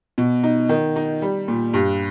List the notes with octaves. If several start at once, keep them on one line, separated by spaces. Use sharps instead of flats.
B2
D#4
D#3
D#4
G3
A#2
G2